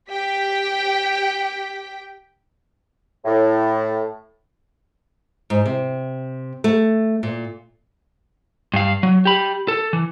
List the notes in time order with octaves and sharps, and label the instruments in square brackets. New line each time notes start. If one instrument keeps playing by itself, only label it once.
[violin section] G4 G5 B6
[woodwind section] A2
[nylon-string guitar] G#2
C3
A3
A#2
[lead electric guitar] G2 F5
F#3
G4 B5
A4
E3